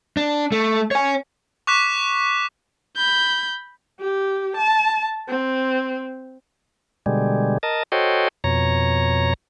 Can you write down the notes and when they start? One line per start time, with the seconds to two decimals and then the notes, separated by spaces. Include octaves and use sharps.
0.17 D4
0.52 A3
0.91 C#5 G#5
1.67 C#6 D6 F#6 B6 E7
2.97 B5 G6
4.00 G4
4.57 A5
5.28 C4
7.06 B2 D3 G3 G#3
7.63 A#4 D#5 A5
7.92 F#4 A4 C5 C#5 D#5 G5
8.44 F2 B2 C#5 A#5